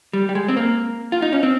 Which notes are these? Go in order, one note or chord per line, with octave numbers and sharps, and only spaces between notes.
G3
G3
G#3
C4
A#3
F4
D#4
C#4
C4